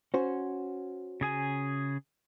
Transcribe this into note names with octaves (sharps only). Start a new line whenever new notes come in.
C#4 F#4 C5
C#3 G#4 G#5